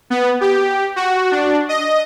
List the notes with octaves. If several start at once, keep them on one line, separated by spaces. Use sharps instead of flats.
B3
G4
F#4
D4
D#5